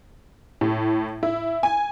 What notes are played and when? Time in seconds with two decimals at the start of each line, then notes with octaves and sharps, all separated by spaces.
0.61 A2
1.23 E4
1.63 G#5